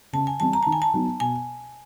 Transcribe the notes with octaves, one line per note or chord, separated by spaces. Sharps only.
C#3 A5
G#5
E3 G3 C4 A5
A#5
D#3 A5
G#5
A5
F#3 B3 D#4
B2 G#5